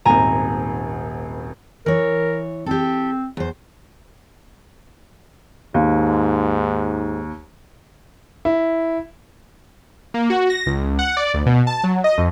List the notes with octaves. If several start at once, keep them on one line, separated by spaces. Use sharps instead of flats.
D#1 G#1 G#5 A#5
E3 A#4 C#5
C4 G4 A4
E2 C5
D#2 G#2
E4
A#3
F#4
A#6
C#2
F#5
D5
D2
B2
A5
F#3
D#5
F2